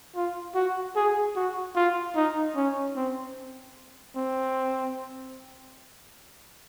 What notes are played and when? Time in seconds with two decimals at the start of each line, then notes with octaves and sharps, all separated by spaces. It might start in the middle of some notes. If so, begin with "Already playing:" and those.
0.16 F4
0.55 F#4
0.96 G#4
1.36 F#4
1.76 F4
2.16 D#4
2.56 C#4
2.96 C4
4.16 C4